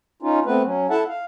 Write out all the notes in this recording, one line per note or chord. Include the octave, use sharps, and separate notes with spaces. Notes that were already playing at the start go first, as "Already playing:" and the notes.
C#4 D#4 F4
A3 B3 C4 B4
F#3 C#4
E4 A4 E5 F#5 A5
F5